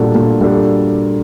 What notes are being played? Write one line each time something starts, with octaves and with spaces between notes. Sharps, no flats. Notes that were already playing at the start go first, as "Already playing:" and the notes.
Already playing: A#2 G3 D4 F#4 A4
A#2
G3 D4 F#4 A4